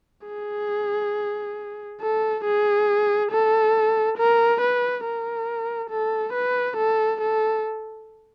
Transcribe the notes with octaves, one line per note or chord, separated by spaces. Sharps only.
G#4
A4
G#4
A4
A#4
B4
A#4
A4
B4
A4
A4